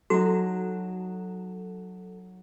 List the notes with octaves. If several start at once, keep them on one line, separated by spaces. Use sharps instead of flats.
F#3 D#4 F#4 A4